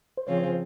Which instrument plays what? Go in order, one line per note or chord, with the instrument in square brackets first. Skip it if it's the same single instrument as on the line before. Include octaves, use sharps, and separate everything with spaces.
[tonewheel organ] C5
[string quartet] C#3 F3 C4 F4 G#4 [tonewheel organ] C#5
[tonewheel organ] C5